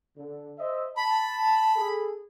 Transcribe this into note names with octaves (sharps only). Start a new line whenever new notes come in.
D3
C5 D#5 E5
A5 B5
G#4 A4